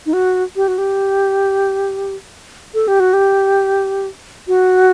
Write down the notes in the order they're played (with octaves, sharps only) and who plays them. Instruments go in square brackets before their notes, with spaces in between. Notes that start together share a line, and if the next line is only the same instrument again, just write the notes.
[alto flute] D#4
F#4
G4
F#4
G4
A4
G4
F#4
G4
F#4